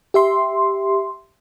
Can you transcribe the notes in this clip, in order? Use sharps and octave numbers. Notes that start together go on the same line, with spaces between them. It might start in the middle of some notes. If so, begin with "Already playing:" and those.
G4 E5 C6